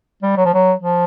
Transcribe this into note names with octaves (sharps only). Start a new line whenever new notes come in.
G3
F#3
F3
F#3
F3